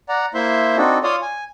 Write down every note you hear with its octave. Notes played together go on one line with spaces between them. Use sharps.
D5 F#5 A#5
A#3 E4 C5 E5 C6
C4 D4 D#4 F#4 A4
F4 C#5 D5 F5 C6 D#6
G#5